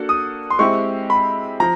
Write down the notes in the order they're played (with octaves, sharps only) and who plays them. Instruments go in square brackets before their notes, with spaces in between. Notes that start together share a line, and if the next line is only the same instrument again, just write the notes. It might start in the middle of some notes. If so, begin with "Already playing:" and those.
Already playing: [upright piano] A#3 D4 F#4 A4
[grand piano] D#6
C6
[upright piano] G#3 C4 E4 G4 [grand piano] C#6
[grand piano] B5
[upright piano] F3 [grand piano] A#5